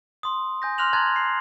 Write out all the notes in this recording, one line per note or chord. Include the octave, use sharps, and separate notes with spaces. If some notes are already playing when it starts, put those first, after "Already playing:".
C6 D#6
G#5 G6 A#6
C6 F6 F#6 A#6 F7 F#7
A5 A#5 C6 F#6 G#6 A6
C7